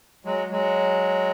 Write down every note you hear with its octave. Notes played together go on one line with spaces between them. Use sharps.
F#3 G#3
F#3 G#3